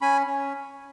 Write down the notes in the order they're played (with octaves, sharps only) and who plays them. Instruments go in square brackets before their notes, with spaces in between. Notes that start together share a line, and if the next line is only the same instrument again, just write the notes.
[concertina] C#4 G#5 B5
C#4